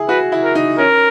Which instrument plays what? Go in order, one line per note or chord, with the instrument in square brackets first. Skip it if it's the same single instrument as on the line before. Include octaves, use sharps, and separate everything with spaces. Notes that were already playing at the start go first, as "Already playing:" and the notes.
Already playing: [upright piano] E4 G#4
[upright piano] F#4 [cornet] B4
[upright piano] E4
[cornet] A#4
[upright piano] D#4
[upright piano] C#4 [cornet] A#4